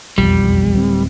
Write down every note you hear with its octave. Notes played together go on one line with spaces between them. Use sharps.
E1 B1 F2 G3
D1 C4